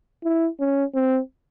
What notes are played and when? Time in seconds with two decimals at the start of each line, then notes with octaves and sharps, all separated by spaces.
0.24 E4
0.60 C#4
0.95 C4